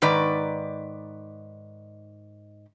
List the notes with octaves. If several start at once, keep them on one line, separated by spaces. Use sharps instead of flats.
G#2 D#3 B4 D5